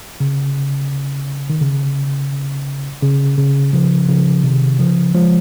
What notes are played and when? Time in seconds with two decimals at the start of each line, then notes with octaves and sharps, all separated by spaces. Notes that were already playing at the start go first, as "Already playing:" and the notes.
0.20 C#3
1.50 D#3
1.61 C#3
3.02 C#3
3.38 C#3
3.73 C#3 F3
4.08 C#3 F3
4.43 C3 D#3
4.79 C#3 F3
5.14 F3 G#3